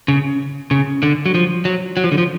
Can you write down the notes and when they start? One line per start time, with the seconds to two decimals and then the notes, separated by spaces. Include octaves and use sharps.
0.08 C#3
0.71 C#3
1.03 D3
1.26 F#3
1.34 F3
1.65 F#3
1.97 F#3
2.04 F3
2.12 D3
2.18 F3